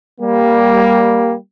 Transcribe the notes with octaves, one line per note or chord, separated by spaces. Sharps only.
G3 A#3